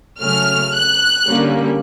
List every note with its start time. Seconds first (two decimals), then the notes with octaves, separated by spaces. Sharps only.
0.20 C#3 F#3 A3 C#4 F6
0.74 F#6
1.27 D3 G3 A#3 C#4